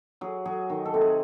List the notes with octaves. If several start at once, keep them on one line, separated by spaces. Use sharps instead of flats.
F#3 G#4
F#3 G#4
D#3
A4
C3
G#4